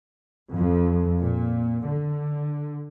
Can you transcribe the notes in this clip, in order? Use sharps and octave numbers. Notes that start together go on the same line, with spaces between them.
F2
A#2
D3